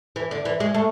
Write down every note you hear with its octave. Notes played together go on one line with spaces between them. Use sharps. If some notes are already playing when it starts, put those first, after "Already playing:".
E3
D3
E3
G#3
A3